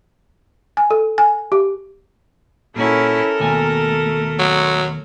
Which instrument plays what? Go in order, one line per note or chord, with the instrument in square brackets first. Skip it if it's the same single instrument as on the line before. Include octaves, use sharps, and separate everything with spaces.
[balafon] G#5
A4
G#5
G4
[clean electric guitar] A#2 F#4 [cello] C#4 E4 [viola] A4 A#4
[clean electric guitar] D#2 B2 G#5 [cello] A3
[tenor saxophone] F#3